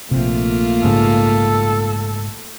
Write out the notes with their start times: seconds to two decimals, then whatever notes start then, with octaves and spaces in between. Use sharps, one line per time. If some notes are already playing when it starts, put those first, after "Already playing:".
0.11 A#1 C3 A3 A#3 F4
0.84 G#2 C#3 A4